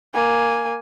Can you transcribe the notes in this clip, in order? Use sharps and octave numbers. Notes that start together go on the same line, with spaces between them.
A#3 G#5